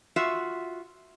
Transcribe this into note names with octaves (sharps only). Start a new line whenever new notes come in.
F4 F#4 E5